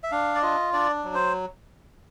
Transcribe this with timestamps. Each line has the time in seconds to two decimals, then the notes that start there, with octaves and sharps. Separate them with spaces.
0.03 E5
0.11 D4 F5
0.35 D5
0.42 F4 D#5
0.73 D4 D5
1.04 F#3
1.14 C5